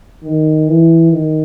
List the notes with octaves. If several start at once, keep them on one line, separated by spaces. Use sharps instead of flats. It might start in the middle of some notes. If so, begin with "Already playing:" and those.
D#3
E3
D#3